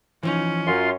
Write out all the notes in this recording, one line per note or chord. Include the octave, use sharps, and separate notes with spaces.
E3 F3 C#4 D#4
F#2 F4 C6